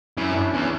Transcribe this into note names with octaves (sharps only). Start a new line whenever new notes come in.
F#2 E4
C#4
D4
E2 C#4